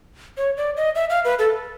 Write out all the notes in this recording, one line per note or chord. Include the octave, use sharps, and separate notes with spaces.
C#5
D5
D#5
E5
F5
B4
A4